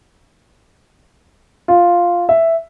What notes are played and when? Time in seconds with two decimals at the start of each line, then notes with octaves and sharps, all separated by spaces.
1.68 F4
2.29 E5